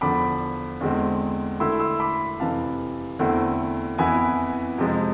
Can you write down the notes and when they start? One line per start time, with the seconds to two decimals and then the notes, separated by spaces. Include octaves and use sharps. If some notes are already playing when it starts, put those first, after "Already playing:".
0.01 E2 D3 F3 B5 D6
0.81 E2 D3 G#3 C4
1.60 D3 A3 E4 C6 E6
1.80 C6 E6
2.00 B5 D6
2.40 F2 C3 E3 F5 A5
3.19 E2 D3 A3 C4 E4
3.98 F2 E3 B3 E4 G#5 B5
4.78 F2 C3 F3 G#3